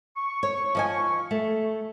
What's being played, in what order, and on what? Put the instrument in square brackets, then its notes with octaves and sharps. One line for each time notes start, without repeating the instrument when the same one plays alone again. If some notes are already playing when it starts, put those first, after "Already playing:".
[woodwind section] C#6
[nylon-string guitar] C#5
F3 D#5 G#5
A3